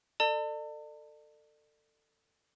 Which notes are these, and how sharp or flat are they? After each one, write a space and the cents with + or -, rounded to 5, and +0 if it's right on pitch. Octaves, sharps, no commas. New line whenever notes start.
A4 +25 D5 +40 A5 +40